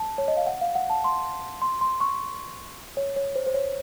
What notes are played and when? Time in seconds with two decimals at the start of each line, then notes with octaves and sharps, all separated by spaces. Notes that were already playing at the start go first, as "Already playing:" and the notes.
Already playing: A5
0.18 C#5
0.28 D#5
0.37 F5
0.47 F#5
0.61 F5
0.75 F#5
0.90 A5
1.04 C6
1.62 C6
1.81 C6
2.01 C#6
2.97 C#5
3.16 C#5
3.36 C5
3.46 C5
3.54 C#5